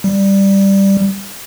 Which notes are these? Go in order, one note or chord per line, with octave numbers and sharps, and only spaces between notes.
G3